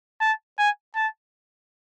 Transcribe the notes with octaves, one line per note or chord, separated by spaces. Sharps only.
A5
G#5
A5